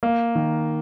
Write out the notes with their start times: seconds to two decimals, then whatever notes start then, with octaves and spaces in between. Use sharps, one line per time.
0.03 A#3
0.35 D#3